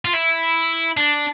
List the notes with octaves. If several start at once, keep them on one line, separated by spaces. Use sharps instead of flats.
F4
E4
D4